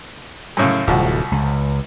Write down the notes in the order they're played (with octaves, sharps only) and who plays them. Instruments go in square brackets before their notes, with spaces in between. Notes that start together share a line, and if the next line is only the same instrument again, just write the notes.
[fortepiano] F#2 A2 C#3
[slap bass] D1 [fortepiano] C2 F3 F#4
[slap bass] C#2